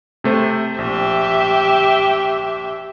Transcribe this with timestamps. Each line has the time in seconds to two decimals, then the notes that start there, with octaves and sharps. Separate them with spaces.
0.24 C3 A3 C5
0.78 A#1 G4 E5